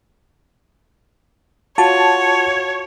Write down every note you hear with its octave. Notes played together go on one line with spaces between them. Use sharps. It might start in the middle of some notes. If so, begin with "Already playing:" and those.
F4 F#4 C#5 A5